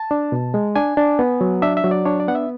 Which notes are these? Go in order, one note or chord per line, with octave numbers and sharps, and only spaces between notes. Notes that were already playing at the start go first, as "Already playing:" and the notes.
Already playing: A5
D4
B2
G#3
D4 G#5
D4
B3
F#3
D4 E5
E5
F#3
D5
D4 C#5
D5
B3 F#5
E5